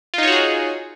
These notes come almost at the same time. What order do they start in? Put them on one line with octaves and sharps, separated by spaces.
F4 D#4 C#5 F#4 G#4